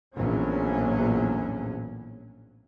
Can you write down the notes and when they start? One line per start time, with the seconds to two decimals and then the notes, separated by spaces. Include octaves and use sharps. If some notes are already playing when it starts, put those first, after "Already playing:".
0.16 A#1 E2 A2 F#3 C#4